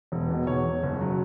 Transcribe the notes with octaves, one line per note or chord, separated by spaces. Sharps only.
E1
B2
E2 C#5
E1
F#1
F#3